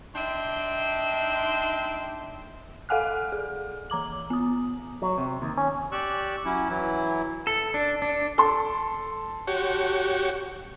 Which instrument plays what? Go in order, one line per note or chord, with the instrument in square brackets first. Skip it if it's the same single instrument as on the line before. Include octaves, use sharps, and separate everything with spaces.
[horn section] D4 D#4 E5 G5 C6
[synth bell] A4 F5 F#5 G#5 F6 F#6
G#4
E3 A#5 D6 F#7
B3 D#6
[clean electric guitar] F#3
C3
D#2
C#4
[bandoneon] G4 D5 C#6 E6 F#6
F#3 C#4 E4
E3 F#3 E4
[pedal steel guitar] A4
D4
D4
[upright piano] A4 C6
[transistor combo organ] F#4 G4 C#5